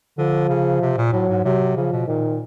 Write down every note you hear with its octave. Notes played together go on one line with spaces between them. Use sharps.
D3 F3
C#3
C3
A#2
A2 F#3
G#2
C3 F#3
C#3 F3
B2
A#2 D#3